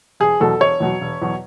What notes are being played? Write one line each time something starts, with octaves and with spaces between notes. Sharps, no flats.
E1 G#4
E2 B2 F#3 A4
E1 C#5
E2 B2 F#3
E1
E2 B2 F#3